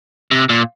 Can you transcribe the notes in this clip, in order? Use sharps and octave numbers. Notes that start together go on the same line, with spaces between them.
C3
A#2